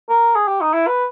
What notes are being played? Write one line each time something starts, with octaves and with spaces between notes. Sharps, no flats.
A#4
G#4
G4
D#4
E4
B4